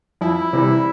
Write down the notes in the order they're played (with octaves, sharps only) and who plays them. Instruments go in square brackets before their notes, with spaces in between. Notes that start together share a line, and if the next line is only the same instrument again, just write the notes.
[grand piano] F2 [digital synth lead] E4
[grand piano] C3 E3 G3